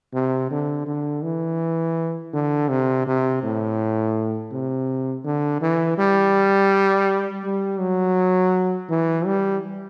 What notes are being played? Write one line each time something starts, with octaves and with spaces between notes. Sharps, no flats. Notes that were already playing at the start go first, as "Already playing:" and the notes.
C3
D3
D3
E3
D3
C3
C3
A2
C3
D3
E3
G3
G3
F#3
E3
G3